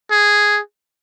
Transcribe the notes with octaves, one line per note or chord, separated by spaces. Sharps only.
G#4